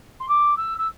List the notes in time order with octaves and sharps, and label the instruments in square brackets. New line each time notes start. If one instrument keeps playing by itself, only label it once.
[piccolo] C6
D6
E6
E6